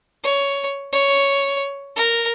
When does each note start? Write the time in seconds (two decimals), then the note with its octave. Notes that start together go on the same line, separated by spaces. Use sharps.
0.24 C#5
0.93 C#5
1.96 A#4